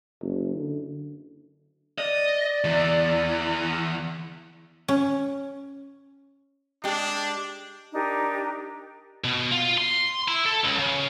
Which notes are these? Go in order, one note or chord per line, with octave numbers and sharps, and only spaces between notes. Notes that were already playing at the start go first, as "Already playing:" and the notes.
F#1
D3
D5 D#5
E2 E3
C#4
G#3 D4 G4
D4 D#4 G4 A#4
B2
F4
C6
E4
A4
C#2
C#3